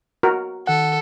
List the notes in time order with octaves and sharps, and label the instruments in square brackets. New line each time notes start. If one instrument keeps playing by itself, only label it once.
[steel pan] F#4 A#4
[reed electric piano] D#3 F#5 [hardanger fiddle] A4